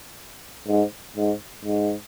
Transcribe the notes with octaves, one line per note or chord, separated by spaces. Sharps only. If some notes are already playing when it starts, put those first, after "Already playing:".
G#2
G#2
G#2